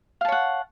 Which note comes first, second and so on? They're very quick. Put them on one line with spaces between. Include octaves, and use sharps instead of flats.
F5 A5 C#5 F#5